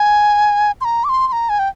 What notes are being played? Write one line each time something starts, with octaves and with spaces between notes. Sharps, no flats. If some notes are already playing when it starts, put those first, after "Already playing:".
Already playing: G#5
C6
A#5
D6
C6
C6
A#5
G#5
G5